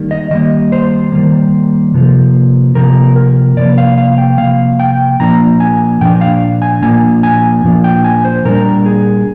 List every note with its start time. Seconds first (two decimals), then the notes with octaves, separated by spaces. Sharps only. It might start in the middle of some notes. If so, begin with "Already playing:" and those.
Already playing: D#3 G3 A#3
0.11 D#5
0.31 D#3 G3 A#3 D#5
0.72 C5
1.12 D#3 G3 A#3
1.94 C3 F3 A#3
2.75 C3 F3 A#3 A#4
3.16 A#4
3.57 C3 F3 A#3 D5
3.78 F5
3.98 F5
4.18 G5
4.38 C3 F3 A#3 F5
4.80 G5
5.20 A#2 F3 A#3 D4 A#5
5.60 G#5
6.01 A#2 F3 D4 G5
6.21 F5
6.62 G#5
6.83 A#2 F3 A#3 D4 G#5
7.23 G#5
7.64 A#2 F3 A#3 D4
7.84 G5
8.04 G#5
8.25 C5
8.45 A#2 G3 D4 A#4
8.86 G#4